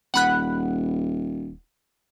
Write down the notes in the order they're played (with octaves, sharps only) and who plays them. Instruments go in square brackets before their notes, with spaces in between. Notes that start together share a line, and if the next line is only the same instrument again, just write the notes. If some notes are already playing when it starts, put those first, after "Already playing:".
[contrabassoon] D#1 [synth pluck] F#5 B5 F#6